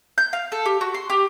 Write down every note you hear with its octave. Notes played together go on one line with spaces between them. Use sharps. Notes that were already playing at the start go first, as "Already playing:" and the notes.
G6
F5
A4
G4
F#4
C6
G4